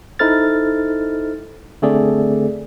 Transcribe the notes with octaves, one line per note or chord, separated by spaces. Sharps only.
D#4 E4 A4 C5 F6 A6
D3 A3 C4 G#4 A4 D5